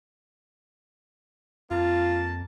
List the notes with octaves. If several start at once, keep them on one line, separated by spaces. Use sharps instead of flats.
F2 A#3 F4 A5